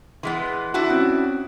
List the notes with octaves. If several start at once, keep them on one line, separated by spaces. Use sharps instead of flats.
E3 G#3 B3 C6
D4 E4 F#4
C4 C#4